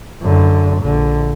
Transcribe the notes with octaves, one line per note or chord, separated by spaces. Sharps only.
F#2 D3
A#1 D3